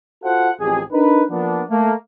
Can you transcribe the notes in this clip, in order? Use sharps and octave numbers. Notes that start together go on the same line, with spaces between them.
F4 F#4 A4 C5 F5 F#5
A1 F2 G4 G#4
D4 D#4 A#4 B4
F3 A#3 B3 D4
A3 A#3